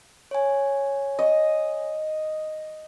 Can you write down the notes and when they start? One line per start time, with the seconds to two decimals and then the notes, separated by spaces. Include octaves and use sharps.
0.31 C#5 G#5
1.19 D#5